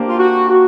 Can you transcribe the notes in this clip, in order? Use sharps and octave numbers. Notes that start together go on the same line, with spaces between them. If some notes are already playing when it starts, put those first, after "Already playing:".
Already playing: A#3 D4 G4 C5
F4
F#4
F#4